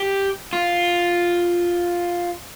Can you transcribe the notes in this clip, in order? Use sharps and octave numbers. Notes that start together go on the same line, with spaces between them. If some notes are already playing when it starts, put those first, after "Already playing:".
Already playing: G4
F4